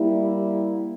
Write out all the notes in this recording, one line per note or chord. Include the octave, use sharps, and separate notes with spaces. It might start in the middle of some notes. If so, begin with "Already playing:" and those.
Already playing: G3 A#3 E4